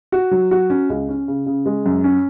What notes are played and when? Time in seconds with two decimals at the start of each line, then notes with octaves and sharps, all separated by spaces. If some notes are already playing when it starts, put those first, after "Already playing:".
0.12 F#4
0.31 F#3
0.51 F#4
0.70 C#4
0.90 C#2
1.09 C#4
1.28 C#3
1.46 C#3
1.66 G#3
1.86 F#2
2.04 C#4